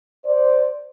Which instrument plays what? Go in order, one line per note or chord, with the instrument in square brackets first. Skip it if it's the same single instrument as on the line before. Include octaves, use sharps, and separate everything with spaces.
[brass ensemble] C5 D5